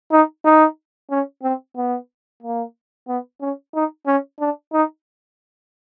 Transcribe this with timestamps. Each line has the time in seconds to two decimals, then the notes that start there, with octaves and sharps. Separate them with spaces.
0.12 D#4
0.45 D#4
1.11 C#4
1.43 C4
1.76 B3
2.43 A#3
3.08 B3
3.41 C#4
3.74 D#4
4.06 C#4
4.40 D4
4.73 D#4